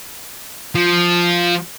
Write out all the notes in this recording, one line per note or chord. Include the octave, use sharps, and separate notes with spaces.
F3